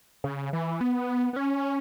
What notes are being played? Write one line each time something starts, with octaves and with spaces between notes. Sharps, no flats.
C#3
E3
B3
B3
C#4